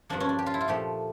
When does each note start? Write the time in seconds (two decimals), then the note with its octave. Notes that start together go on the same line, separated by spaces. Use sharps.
0.09 G2 F3 A#3 D4
0.20 C#4
0.29 D4
0.39 G4
0.46 F4
0.54 E4
0.61 F4
0.68 A#2 F3 A3 G4